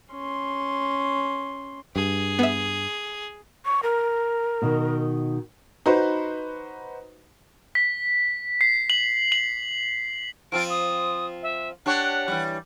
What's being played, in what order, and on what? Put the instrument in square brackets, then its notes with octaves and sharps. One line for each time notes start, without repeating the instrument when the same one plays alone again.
[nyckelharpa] C#4 C6
[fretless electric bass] G2 [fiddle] G#4
[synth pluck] B3 E5
[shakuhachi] C#6
A#4
[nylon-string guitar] B2 D#3
[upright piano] D#4 F#4 B4 C5
[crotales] B6
C7
F#7
F#7
[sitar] F3 C4 F4 [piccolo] D7
[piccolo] D#6
E5
[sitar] D4 G4 C#5 [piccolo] F#5
[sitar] E3 G3